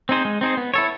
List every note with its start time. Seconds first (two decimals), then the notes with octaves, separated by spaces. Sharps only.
0.09 C4 D#4 G#4 C5
0.25 G#3
0.41 C4 D#4 G#4 C5
0.57 B3
0.74 E4 A4 C#5